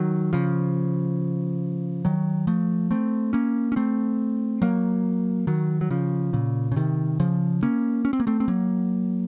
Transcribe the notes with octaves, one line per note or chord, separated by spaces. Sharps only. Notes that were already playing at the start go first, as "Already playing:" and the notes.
Already playing: D#3 F#3
C#3 F3
D#3 F#3
F3 A3
A3 C4
A#3 C#4
C#4
A3 C4
F#3 A#3
D#3 F#3
F#3
C#3 F3
A#2 C#3
C#3
C3 D#3
C#3 F3
A#3 C#4
C#4
C4
A#3
A3 C4
C4
F#3 A#3